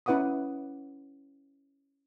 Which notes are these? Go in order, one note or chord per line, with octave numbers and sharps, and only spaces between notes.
C#4 E4 B4 F#5 D6 D#6